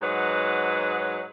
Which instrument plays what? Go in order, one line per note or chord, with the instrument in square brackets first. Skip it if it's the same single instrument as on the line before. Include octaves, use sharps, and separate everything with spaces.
[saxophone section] G#2 F#3 D#4 B4 F#5